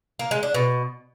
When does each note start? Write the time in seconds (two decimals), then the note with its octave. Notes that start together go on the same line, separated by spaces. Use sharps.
0.19 A#3
0.31 G#3
0.43 D4
0.54 B2